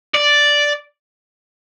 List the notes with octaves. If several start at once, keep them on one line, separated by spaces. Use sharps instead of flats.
D5